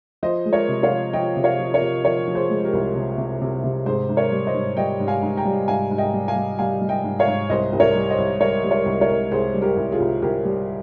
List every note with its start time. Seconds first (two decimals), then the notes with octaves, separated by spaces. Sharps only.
0.23 F3 C5 D#5
0.45 G#3
0.53 A#4 C#5
0.68 C3
0.83 C#5 F5
0.91 F3
1.13 F3 D#5 G5
1.36 C3
1.44 C#5 F5
1.59 F3
1.74 A#4 C#5
1.81 C3
2.04 F3 A#4 C#5
2.27 F3
2.35 G#4 C5
2.50 G#3
2.64 G4 A#4
2.73 C2
2.95 C3
3.18 C3
3.41 C3
3.64 C3
3.86 G#2 G#4 C5
4.09 G#2
4.16 A#4 C#5
4.32 G3
4.47 C5 D#5
4.54 G#2
4.77 G3 D#5 G5
5.00 G#2
5.07 F5 G#5
5.23 G#2
5.37 G5 A#5
5.45 G3
5.68 G#2 F5 G#5
5.91 G#2
5.98 D#5 G5
6.14 G3
6.28 F5 G#5
6.36 G3
6.59 G3 F5 G#5
6.81 G3
6.89 D#5 G5
7.04 G#2
7.19 C#5 F5
7.28 G#2
7.50 C2 C5 D#5
7.73 C2
7.80 A#4 C#5
7.95 G3
8.10 C5 D#5
8.18 C2
8.40 G3 A#4 C#5
8.64 G3
8.71 A#4 C#5
8.86 C2
9.01 A#4 C#5
9.09 C2
9.32 C2 G#4 C5
9.54 G3
9.62 G4 A#4
9.77 C2
9.92 F4 G#4
10.00 C2
10.22 C2 G4 A#4
10.45 G3